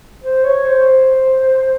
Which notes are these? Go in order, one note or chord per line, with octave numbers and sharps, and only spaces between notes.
C5
C#5
C5